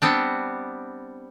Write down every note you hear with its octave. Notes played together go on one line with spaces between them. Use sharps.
G3 B3 C4 D4